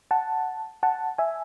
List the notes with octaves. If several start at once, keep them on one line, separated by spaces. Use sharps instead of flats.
F#5 A5
F#5 A5
E5 G#5